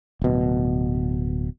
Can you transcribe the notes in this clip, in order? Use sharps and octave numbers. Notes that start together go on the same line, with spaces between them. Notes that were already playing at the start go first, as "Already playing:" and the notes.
D1 B2